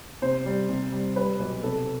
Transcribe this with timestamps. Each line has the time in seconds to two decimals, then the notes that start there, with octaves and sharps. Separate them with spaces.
0.22 C3 C5
0.46 G3
0.69 C3
0.92 G3
1.16 G3 B4
1.39 B1
1.63 C3 A4